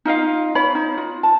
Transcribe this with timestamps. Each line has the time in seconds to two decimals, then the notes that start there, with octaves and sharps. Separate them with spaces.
0.05 D#4 F4 D#5 F5
0.55 C#5 B5
0.75 D#4
0.98 F4
1.23 A5